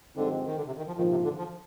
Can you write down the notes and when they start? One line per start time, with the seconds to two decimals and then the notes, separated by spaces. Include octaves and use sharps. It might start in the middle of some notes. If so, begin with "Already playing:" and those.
0.16 G2 D3 F3 G#3 C4 D#4
0.47 D#3
0.57 D3
0.67 C3
0.77 D#3
0.87 F3
0.97 A#1 G#2 D#3 F3
1.11 C3
1.24 D3
1.37 F3